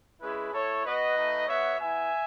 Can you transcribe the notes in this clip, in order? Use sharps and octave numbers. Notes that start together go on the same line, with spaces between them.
G#3 C#4 E4 G#4 B4
A3 E4 A4 C#5
B3 F#4 B4 D#5
A3 D#4 F#4
B3 F#4 C#5 E5
B3 E4 E5 G#5